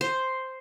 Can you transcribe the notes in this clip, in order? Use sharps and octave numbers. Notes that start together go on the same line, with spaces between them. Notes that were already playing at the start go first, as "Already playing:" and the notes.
C5